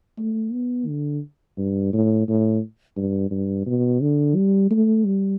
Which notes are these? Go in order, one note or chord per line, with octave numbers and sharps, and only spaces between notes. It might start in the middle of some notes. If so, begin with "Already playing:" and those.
A3
B3
D3
G2
A2
A2
G2
G2
B2
D3
G3
A3
G3